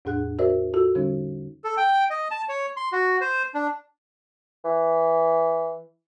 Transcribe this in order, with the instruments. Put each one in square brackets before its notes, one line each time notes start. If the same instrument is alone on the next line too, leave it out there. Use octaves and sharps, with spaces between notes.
[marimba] E2 A2 D4 G#4 F#5 F#6
F#4 A#4 C5 D5 E5
F4 F#4 A4 E6
D3 G3 C#4 D#4
[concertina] A4
G5
D#5
A5
C#5
C6
F#4
C5
D4
[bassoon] E3